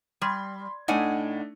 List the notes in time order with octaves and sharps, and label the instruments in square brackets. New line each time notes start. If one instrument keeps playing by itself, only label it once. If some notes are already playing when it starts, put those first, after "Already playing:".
[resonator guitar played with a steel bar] G3 [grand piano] B5 C6 G#6
[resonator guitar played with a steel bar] A2 F#5 G#5 [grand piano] A3 D4 D#4